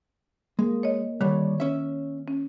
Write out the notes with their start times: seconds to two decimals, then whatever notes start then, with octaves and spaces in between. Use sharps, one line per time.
0.59 G#3 A#3
0.83 C#5 D#5
1.21 D3 D#3 G3 C#5
1.60 C#4 E5
2.28 C#4